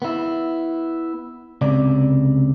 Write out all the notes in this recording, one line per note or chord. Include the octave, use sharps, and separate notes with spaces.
B3 E4
C#2 C3 D5